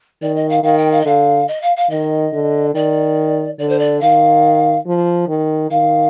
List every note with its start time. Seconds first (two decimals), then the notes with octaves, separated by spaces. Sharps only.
0.22 D#3 D5
0.36 D#5
0.49 F5
0.63 D#3 F5
0.78 G5
0.91 F5
1.00 D#5
1.05 D3 F5
1.48 D#5
1.62 F5
1.76 F5
1.90 D#3 D#5
2.33 D3
2.74 D#3 D5
3.59 D3 D5
3.69 C5
3.79 D5
4.01 D#3 F5
4.86 F3
5.28 D#3
5.70 D#3 F5